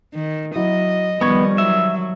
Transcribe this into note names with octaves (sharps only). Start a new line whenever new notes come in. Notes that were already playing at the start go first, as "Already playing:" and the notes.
D#3
F#3 E4 D#5
D#3 F3 G3 B3 C#6 G#6
F#3 E5